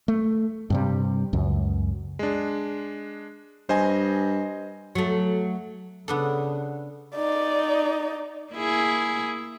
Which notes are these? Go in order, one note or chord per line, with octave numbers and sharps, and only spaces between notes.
A3
G2 C3 G3
C#2 F#2
G#3 D4
G2 C5 D#5 G#5
F#3 A3
C#3 B3 D4 A4
D#4 D5
A#3 E4 G#4